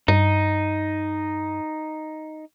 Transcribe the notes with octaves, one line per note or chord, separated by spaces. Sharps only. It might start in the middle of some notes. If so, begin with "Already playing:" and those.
G2 D#4